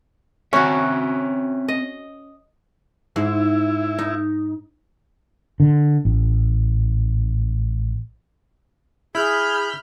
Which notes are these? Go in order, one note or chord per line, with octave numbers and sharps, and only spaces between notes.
C4 C#4 F#4 C#5 E5
D#5
G#2 E4
D#4
D3
A1
E4 G#4 B5 F6 G6